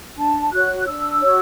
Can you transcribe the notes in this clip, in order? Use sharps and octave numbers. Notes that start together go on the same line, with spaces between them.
D4 A5
F#4 C#5 F#6
D4 E6
F#4 C#5